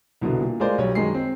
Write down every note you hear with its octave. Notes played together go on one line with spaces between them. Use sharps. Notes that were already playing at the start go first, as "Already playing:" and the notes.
C2 B2 D3
A#2
G#3 A3 F4 A#4 C5 D5
B1 G3 C#5
F#2 D#3 G#3 C7
C4